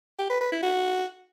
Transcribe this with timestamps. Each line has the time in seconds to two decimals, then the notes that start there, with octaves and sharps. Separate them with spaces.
0.19 G4
0.30 B4
0.41 B4
0.52 E4
0.63 F#4